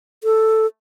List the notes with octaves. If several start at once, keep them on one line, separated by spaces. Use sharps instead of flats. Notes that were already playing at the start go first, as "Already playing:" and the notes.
A4